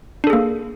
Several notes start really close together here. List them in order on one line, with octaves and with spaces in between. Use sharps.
D4 A4 G#4 A#3